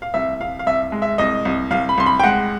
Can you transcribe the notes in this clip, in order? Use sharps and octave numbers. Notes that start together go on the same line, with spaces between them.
F5
C2 E5
C2 F5
F5
C2 E5
G#3
E5
C2 D#5
C2
C2 F5
B5
C2 C6
B5
G5
G#3 F#5